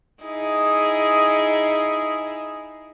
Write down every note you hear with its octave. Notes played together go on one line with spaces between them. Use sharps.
D#4 E4 G#4